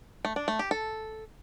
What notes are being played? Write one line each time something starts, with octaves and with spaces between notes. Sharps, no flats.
A3
D4
A3
G4
A4